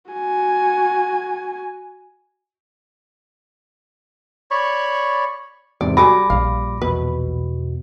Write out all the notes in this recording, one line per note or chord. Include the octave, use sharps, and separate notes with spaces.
F#4 G#5
C#5 D5 B5 C#6
E2 G#2 C3 D5
F#3 G3 A4 G#5 B5 D6 A#6
A#1 F5
E2 B2 B4